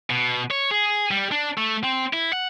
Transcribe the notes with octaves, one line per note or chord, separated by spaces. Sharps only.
B2
C#5
G#4
G3
D4
A3
C4
E4
F#5